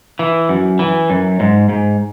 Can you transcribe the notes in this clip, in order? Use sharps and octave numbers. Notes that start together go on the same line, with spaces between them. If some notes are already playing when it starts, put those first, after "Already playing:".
E3
F#2
E3
F#2
G#2
G#2